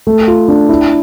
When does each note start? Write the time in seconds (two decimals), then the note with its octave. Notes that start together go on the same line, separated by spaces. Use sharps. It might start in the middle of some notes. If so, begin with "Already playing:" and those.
0.07 A3
0.28 F4
0.48 D4
0.69 E4